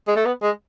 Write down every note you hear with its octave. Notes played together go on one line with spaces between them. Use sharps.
G#3
A3
B3
G#3